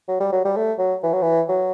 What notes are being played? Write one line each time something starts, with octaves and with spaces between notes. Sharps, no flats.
F#3
G3
F#3
G3
A3
F#3
E3
F#3
E3
F#3